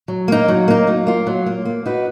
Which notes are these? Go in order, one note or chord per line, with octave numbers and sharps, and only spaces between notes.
F#3
A#3 D#4
F#3
A#3 D#4
F#3
A#3 F4
F#3
A#3 F4
A#3
D#4 F#4 B4